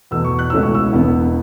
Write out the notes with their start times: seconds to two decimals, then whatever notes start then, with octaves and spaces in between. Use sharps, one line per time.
0.11 E2 B2 A3 E6
0.25 C#6
0.39 F#6
0.50 C#2 B2 A3 C#4 E4 E6
0.63 C#6
0.75 E6
0.93 E1 E2 E3 B3